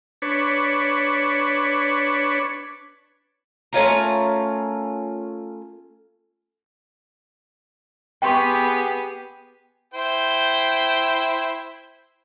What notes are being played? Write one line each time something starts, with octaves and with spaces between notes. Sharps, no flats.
D4 B4 C#5
A3 C#4 F4 A#4
B3 G4 G#4 G5 C6 C#6
E4 C5 G5